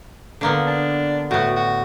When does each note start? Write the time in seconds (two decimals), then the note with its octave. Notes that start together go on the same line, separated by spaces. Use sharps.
0.41 D3 A#3 B3
0.67 D4
1.31 A2 B3 F#4
1.56 F#4